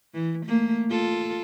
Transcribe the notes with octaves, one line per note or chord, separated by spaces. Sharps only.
E3
A3 A#3
F4 A4